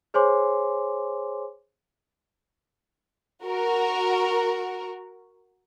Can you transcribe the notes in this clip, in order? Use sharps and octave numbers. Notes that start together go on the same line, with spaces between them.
G#4 C5 C#5 G#5 C6 D6
F#4 A#4